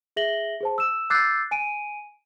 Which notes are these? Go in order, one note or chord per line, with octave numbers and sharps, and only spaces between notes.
G#4 E5 A#6 F#7 G7
G#4 C5 A5
E6 E7
D6 E6 F#6 G6 A6 C7
G#5 D7 D#7